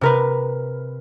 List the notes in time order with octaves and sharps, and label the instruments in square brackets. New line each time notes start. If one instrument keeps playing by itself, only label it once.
[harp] C3 A#4 B4